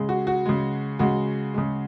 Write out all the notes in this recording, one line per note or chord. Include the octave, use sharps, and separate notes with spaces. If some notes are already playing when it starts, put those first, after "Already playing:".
Already playing: C#3 G#3
F#4
F#4
C#3 G#3
C#3 G#3 F#4
C#3 G#3